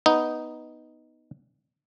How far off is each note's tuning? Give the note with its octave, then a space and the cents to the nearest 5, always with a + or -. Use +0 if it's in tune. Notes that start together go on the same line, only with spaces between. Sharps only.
B3 +0 D#4 +0